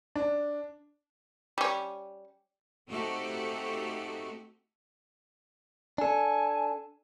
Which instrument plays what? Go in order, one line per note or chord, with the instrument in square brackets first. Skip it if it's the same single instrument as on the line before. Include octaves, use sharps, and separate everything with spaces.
[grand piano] D4
[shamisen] G3 C#4
[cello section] A3 C4 D#4 F#4 G4 A4
[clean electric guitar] D4 A4 [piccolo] G#5